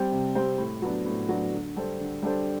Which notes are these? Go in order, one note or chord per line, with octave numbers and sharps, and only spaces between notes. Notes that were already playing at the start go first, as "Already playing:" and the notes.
Already playing: G3 C4 G4 C5
C3
G3 C4 G4 C5
A2
F#3 B3 D4
A2
F#3 B3 D4
D3
G3 D4 A4 C5
D3
G3 D4 A4 C5